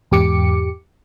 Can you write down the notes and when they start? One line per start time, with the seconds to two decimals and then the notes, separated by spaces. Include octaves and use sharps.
0.11 E2 G#2 G4 D6 C#7